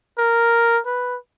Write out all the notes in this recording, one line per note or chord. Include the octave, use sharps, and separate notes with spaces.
A#4
B4